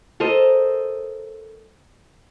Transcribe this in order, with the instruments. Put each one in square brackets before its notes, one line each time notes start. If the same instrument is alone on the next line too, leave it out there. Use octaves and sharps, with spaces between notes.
[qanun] A4 A#4 C5 D#5